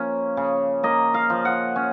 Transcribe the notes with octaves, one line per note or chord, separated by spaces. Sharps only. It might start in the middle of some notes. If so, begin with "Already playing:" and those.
Already playing: F3 A#3 C#4
C#3
A#3 D#5
F5
F3
F#5
C#4